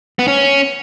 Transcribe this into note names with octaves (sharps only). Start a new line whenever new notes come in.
B3
C#4